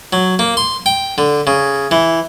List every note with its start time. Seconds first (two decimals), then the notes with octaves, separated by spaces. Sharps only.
0.13 F#3
0.39 A#3
0.57 C6
0.86 G5
1.18 D3
1.47 C#3
1.91 E3